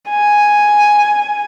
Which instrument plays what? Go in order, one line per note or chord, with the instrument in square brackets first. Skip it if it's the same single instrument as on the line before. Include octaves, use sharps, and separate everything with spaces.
[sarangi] G#5